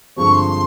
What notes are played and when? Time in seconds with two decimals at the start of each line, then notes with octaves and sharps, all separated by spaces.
0.16 G2 D3 F3 G#3 C4 C#6
0.32 C6